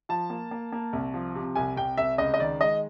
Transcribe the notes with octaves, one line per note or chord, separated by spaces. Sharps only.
F3 A5
A#3
A#3
A#3
C2
F3
C3
C2 G#5
C2 G5
C2 E5
C#2 D#5
D#5
D#3 D5
G#3 D#5